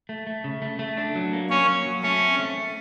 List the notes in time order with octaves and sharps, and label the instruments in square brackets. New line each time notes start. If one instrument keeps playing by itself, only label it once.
[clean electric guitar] A3
A3
C#3
A3
A3
D4
F#3
A#3
[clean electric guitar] A#3 [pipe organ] C#4 C#5
[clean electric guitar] F#3
F#3
[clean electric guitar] A3 [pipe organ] C#4 C#5
[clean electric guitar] C4
A3
A3